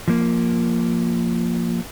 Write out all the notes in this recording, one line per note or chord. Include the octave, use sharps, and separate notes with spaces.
F3 A#3